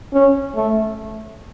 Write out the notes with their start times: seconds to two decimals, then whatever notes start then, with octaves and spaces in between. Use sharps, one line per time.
0.13 C#4
0.56 A3